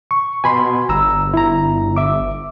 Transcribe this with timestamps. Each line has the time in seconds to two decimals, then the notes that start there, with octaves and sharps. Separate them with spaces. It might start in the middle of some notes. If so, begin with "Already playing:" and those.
0.11 C#6
0.44 B2 G#5 B5 C6
0.89 G1 A#5 E6
1.34 E4 A#5
1.97 E5 D6